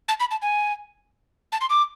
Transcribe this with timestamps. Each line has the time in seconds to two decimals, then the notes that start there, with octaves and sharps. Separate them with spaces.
0.08 A5
0.20 B5
0.31 A5
0.42 G#5
1.52 A5
1.61 C6
1.70 D6